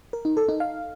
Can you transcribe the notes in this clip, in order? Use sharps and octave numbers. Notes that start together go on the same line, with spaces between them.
A#4
D#4
A4
D#4
F5